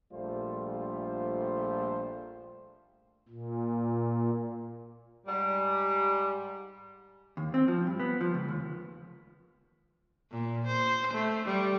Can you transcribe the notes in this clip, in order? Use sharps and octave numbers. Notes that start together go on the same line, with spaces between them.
A#1 G3 A3 F4 C5
A#2
G#2 G3
D#2
C4
F3
G2
B3
F3
C#2
D#2
A#2
C5
A3
G3